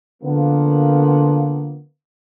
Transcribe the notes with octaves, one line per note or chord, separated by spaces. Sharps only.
D3 F3 A#3 B3